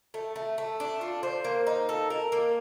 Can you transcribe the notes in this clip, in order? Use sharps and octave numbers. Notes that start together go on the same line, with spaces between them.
A3
A3
A3
D4
F4
C5
A#3
D#4
A4
A#4
A#3